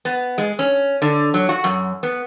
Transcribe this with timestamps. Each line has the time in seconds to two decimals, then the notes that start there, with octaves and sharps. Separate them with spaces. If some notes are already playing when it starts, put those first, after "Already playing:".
0.05 B3
0.38 G#3
0.59 C#4
1.02 D3
1.34 F#3
1.49 F#4
1.64 F#2
2.03 B3